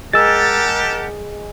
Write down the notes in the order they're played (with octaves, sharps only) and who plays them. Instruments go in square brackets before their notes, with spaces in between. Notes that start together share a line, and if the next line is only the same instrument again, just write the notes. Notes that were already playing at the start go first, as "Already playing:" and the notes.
[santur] G#3 [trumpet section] G4 A5 [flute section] A#4 F#5 [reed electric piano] E6 A6